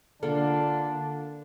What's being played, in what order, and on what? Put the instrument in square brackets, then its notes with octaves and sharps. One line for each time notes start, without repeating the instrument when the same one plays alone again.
[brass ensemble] D3 D4 [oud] A#3 F4 A4